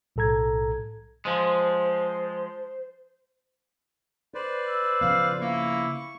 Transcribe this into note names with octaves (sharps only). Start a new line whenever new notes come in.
B1 A2 A4 A#5 G#6
F3 G#3 C5
B4 C5 D5
E6
C#3 F3 B3 F5
A#3 E4 C#6